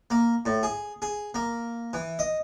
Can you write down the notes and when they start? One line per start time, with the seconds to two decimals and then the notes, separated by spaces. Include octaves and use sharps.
0.10 A#3
0.46 A2
0.63 G#4
1.02 G#4
1.34 A#3
1.93 E3
2.19 D#5